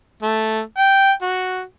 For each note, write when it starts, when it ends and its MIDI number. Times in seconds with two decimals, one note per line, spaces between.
0.22 0.60 57
0.78 1.11 79
1.22 1.62 66